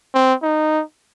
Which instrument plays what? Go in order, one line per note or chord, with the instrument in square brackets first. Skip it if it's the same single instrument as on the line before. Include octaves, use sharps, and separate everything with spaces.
[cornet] C4
D#4